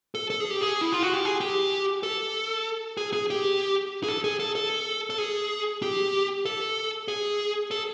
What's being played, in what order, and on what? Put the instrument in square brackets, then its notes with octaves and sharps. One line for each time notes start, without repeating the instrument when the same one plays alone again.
[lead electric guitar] A4
A4
G#4
G4
G#4
E4
F4
F#4
G4
G#4
G4
A4
G#4
G#4
G4
G#4
A4
G#4
A4
A4
A4
G#4
G4
A4
G#4
A4